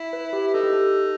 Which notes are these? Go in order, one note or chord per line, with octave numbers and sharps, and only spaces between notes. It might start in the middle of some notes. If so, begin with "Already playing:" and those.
Already playing: E4
B4
G4
E4
D#4 A4
G4
A4